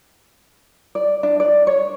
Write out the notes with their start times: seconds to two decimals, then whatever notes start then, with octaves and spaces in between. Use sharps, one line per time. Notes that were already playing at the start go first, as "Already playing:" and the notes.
0.95 D5
1.23 D4
1.40 D5
1.67 C#5